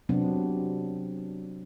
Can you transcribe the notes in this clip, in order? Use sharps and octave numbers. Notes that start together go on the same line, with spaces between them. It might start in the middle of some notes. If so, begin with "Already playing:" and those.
C3 F#3 B3 C4 D4